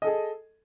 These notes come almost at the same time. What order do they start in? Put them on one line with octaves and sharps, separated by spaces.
D#5 A4 G#4